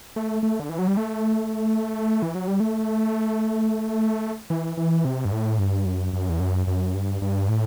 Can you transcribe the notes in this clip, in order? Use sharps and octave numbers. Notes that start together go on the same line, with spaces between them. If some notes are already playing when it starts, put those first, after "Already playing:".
A3
A3
D3
E3
F#3
G3
A3
E3
F#3
G3
A3
E3
E3
C3
G2
A2
G2
F#2
F#2
E2
F#2
F#2
G2
G2
A2